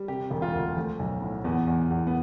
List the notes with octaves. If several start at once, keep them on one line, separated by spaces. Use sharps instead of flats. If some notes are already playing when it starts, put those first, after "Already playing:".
Already playing: G3
C3 G4
E1
F4
D2
F3 A3
B1
A2
E2 B3
E2
E2
B3